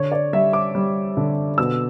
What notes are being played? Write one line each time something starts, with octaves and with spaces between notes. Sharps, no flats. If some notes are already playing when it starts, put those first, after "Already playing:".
Already playing: D3 C#5
D5
G3 E5
D6
G3
D3
B2 E6